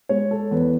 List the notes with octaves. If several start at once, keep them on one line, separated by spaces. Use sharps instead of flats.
G#3 C#5
A4
E2 B4